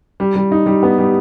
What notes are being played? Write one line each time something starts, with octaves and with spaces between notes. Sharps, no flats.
G3
G3
D#4
G3
B3
G3